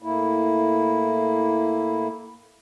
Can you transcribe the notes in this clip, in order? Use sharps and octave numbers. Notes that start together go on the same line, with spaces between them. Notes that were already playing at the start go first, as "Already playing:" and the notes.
A2 A#3 E4